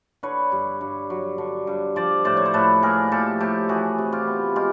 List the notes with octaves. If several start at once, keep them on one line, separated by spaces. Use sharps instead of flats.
D3 B4 C#5
G2
G2
F#3
D3
G2
F3 C5 D5
A2 C5 D5
C#5
C5
A2 A4 B4
A#3 G#4 A#4
F3 G4 A4
A2 G4 A4
E3 F#4 G#4
C3
F4 G4
B3
G#3 F4 G4